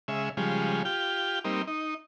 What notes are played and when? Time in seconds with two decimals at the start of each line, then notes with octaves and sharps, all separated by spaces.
0.08 C#3 G#3 E5
0.37 C#3 F3 G3 G#3
0.85 F4 G4 G5
1.45 G3 A#3 C4 D#4
1.67 D#4